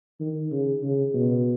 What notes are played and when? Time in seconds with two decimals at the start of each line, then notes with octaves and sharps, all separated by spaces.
0.20 D#3
0.52 C#3
0.83 C#3
1.14 B2